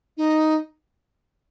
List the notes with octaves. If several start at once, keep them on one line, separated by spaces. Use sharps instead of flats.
D#4